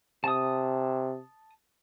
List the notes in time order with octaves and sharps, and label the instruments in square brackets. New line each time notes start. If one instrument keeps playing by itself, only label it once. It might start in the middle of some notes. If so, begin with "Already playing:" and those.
[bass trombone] C3 [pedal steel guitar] A5 D#6